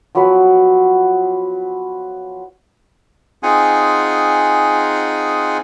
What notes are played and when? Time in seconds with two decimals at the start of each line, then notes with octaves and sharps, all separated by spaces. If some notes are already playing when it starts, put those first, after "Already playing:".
0.15 F3 F#3 B3 B4
3.43 C4 D#4 F4 G#4 F#5 G#5